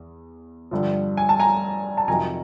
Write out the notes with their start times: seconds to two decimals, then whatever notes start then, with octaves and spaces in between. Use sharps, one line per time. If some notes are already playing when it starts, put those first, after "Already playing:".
Already playing: E2
0.71 G2 D3 F3
1.17 G#5
1.29 A5
1.40 G#5 A#5
1.98 A5
2.08 F2 C3 D#3 F#3 G#5 A#5